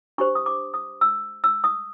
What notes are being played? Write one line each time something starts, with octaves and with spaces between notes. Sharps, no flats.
D4 G4 C5 C#6
D#6
D6
D#6
E6
E6
D#6